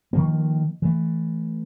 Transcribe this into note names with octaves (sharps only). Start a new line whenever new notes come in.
D#3 F3 A#3
E3 A3